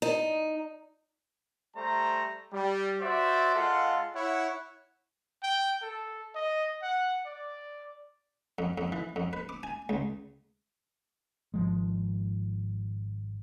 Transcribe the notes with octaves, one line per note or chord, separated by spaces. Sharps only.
D#4
G3 A3 C5 A#5
G3
F#4 C5 D5 E5
G#3 F4 A4 F5 F#5
E4 C#5 F#5
G5
A4
D#5
F#5
D5
F2
F2
E3
F2
B4
D6
G#5
C#2
G#1 F3 G#3